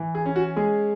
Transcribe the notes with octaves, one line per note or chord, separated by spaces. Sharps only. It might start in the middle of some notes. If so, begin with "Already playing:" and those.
Already playing: E3
G#4
C#4
F#4
G#3 G#4